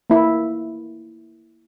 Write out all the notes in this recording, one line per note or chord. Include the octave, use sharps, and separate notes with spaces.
A#3 E4